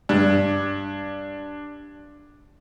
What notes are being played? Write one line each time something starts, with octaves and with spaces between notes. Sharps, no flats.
G2 D4